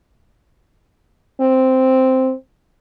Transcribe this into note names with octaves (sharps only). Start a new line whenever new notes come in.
C4